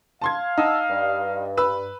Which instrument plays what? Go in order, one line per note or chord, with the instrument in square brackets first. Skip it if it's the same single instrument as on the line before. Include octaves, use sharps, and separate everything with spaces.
[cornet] F5 [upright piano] A5 C6 G#6
[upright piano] D#4 [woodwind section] F#5 A5 E6
[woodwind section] G2
[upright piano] B4 E6